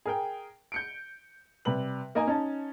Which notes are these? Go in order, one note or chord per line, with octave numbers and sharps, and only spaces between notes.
G#4 A#4 G5
G6 C#7 D7
C3 G3 B4 F#7
A#3 D#4 D#5 G#5 A#5
C#4 D#4 A5